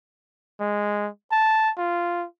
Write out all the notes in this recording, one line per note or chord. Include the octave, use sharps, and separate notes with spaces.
G#3
A5
F4